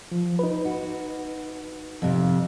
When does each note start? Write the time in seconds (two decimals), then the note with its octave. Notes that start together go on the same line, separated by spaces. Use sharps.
0.11 F3
0.39 D#4 B4
0.65 F#4
2.02 F2 C3